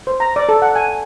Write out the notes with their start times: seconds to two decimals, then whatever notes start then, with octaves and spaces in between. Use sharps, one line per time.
0.07 C5
0.20 A#5
0.36 D5
0.49 A4
0.62 F#5
0.76 G#5